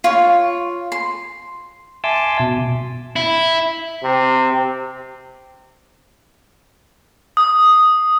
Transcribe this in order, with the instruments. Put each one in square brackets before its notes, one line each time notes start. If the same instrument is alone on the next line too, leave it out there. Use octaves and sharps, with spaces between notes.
[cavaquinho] F4 C#5
C6
[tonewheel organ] E5 G#5 A5 C6 D6 E6
B2
[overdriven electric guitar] E4
[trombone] C3
[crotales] D#6